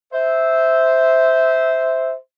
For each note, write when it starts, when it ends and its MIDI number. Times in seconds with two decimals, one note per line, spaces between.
0.13 2.14 72
0.13 2.14 76